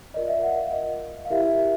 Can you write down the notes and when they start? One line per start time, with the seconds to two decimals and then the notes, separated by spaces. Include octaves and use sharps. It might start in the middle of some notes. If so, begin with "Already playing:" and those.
0.14 F4 A#4 D5 D#5
0.28 E5
0.43 F#5
0.57 F5
0.72 D#5
1.25 F5
1.30 E4 G4 A#4 E5